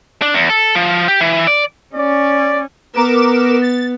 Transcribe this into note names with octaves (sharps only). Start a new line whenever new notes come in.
D4
E2
A4
F3
G4
E3
D5
C#4 D5
B3 A#4 D6 E7
A6